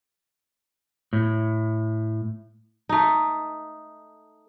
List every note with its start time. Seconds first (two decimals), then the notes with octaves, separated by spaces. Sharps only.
1.13 A2
2.89 A3 D#4